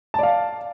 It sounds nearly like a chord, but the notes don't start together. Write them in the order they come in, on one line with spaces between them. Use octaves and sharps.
A5 D5 F5